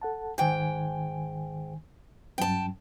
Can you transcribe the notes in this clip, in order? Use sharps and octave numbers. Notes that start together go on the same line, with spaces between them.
A4 F#5 A5
G#2 D#3 G5 G#5
G2 F#3 C#4 G5 A5